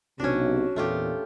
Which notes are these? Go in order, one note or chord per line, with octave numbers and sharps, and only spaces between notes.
B1 C3 C#4 D4 F#4
E2 A#2 A3 F4 G4